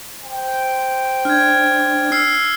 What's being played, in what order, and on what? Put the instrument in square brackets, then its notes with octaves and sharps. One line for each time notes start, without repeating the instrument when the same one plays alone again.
[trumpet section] C5 G5
[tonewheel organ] D4 [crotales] F6 G#6
[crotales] E6 F6 C7